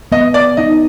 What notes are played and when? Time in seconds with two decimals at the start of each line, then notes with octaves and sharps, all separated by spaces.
0.12 B3 D#5
0.34 D5
0.57 D#4 D#5